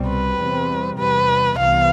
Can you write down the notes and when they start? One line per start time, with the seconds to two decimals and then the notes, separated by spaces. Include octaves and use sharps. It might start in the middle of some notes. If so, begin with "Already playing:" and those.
Already playing: C2 B2 G3 C4
0.09 B4
0.39 E2 C3 G3 C4
0.98 E2 C3 G3 B4
1.59 C2 C3 E3 B3 F5